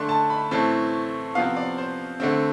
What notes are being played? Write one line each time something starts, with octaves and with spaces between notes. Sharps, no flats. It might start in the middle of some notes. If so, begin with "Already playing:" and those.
Already playing: D3 A3 D4 C6
A5
B5
A2 E3 A3 C4 A5
C3 F3 B3 F5
D5
C5
D3 A3 C4